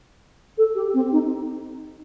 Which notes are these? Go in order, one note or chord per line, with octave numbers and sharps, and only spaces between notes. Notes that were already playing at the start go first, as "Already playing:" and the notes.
A4
G4
C4
D#4